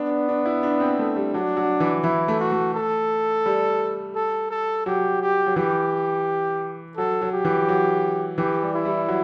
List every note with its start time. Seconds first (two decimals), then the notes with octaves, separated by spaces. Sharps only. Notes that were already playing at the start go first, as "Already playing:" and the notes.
Already playing: B3 D4
0.10 D4
0.29 D4
0.45 E4
0.63 D4
0.80 C4
0.99 A3
1.16 G3
1.34 F#3 D4
1.57 F#3
1.80 E3
2.04 E3 E4
2.28 A3
2.40 F#4
2.52 A3
2.74 A4
3.46 G3
4.16 A4
4.51 A4
4.86 F#3 G4
5.22 G4
5.46 F#3
5.56 E3 G4
6.97 F#3 A4
7.22 F#3
7.33 G4
7.45 E3
7.69 F#3
8.38 E3 G4
8.63 G3
8.74 E4
8.85 G3
9.08 F#3